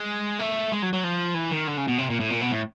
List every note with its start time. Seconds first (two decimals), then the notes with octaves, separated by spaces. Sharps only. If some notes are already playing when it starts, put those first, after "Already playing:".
Already playing: G#3
0.39 A3
0.72 G#3
0.82 F#3
0.93 F#3
1.04 F3
1.34 E3
1.51 D#3
1.67 D3
1.77 C#3
1.88 B2
1.98 C3
2.10 A#2
2.20 A2
2.30 A#2
2.41 B2
2.51 A2